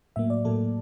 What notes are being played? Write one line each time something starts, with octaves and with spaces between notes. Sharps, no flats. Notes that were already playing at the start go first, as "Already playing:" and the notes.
A2 F#3 A#3 E5
D5
A2 F#3 A#3 A4